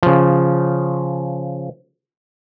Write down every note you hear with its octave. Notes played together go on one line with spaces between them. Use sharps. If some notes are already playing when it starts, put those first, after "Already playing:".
C#3 F3